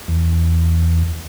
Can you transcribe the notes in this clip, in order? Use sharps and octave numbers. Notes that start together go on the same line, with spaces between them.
E2